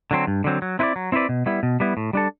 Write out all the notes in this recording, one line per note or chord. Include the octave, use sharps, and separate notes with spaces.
D3 F#3 C4
G2
D3 F#3 C4
F#3
C4 E4 B4 D5
F#3
C4 E4 B4 D5
B2
G3 B3 E4
B2
G3 B3 E4
A2
G3 D4 A4